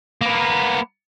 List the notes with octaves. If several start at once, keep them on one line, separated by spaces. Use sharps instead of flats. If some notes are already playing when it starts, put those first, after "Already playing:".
A#3 B3